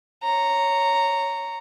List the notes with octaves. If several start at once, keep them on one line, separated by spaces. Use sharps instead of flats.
C#5 A#5